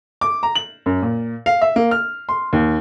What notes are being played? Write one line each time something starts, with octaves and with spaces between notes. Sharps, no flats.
D6
A#5
F#7
F#2
A#2
F5
E5
A#3
F6
C6
D#2